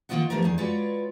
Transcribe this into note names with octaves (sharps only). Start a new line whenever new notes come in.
D#3 F3 A#3 F4 D#5 F#5
F3 G3 A3 B3 D4 A#4
E2 D#4 G#4
G#3 F4 F#4 B4 C#5 D5